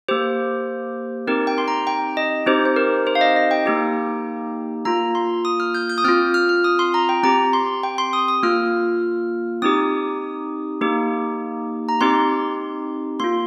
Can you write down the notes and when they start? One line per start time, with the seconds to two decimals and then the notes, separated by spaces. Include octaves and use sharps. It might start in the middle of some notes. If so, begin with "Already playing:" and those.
0.08 A#3 G4 C5
1.27 C4 D#4 G4 A#4
1.47 G5
1.58 C6
1.68 A#5
1.87 G5
2.17 D#5
2.46 C4 D#4 G4 C5
2.65 C5
2.76 A#4
3.07 C5
3.15 F5
3.21 D#5
3.36 D#5
3.51 G5
3.66 A#3 D#4 G4
4.85 A#3 F4 A#5
5.15 C6
5.45 D#6
5.60 F6
5.75 G6
5.90 G6
5.98 D#6
6.04 C4 F4 F6
6.34 F6
6.49 F6
6.64 D#6
6.79 C6
6.94 A#5
7.09 G5
7.23 C4 G4 A#5
7.53 C6
7.83 G5
7.98 C6
8.13 D#6
8.28 D#6
8.43 A#3 F4 F6
9.62 C4 D#4 G4 D#6
10.81 A#3 D#4 G4
11.89 A#5
12.01 C4 D#4 G4 C6
13.20 A#3 F4 C6